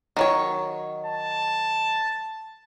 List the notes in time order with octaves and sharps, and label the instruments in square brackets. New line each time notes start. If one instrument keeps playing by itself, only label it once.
[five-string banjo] D#3 F#3 C#5
[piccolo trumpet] A5